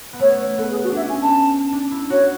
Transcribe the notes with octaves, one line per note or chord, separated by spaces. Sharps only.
B3
A3 C#5
B3 A4
G#4
F#4
C#4 D4 E5
G#5
A5
D4
E4
F#4 C#5